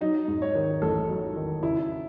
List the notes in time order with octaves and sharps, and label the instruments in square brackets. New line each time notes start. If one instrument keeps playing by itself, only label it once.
[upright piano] F#3 D#4
G#2
C#5
D#3
A1 A4
F#3
D#3
C#3 E4